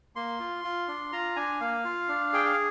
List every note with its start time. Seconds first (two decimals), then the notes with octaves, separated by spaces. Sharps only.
0.16 A#3 C6
0.40 F4
0.64 F4
0.88 D4
1.12 F4 A#5
1.36 D4 G#5
1.61 A#3 F5
1.85 F4
2.08 D4
2.33 G#4 G5
2.45 F5